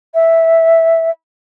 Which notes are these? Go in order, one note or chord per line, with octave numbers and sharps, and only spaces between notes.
E5